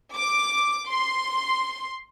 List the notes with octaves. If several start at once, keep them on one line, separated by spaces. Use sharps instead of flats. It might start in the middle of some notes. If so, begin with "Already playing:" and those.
D6
C6